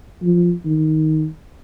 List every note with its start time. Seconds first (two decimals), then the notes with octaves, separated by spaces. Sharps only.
0.23 F3
0.65 D#3